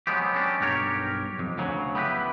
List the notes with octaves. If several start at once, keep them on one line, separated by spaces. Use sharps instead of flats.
F#3 G#3 B3 C4 G4
C#4 D4 F#4 G4
B1 G2 G4 A#4 C#5
F2
D2 C#3 F#3
B3 E4 G4 A#4 B4